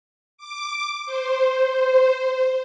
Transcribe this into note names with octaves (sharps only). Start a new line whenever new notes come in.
D6
C5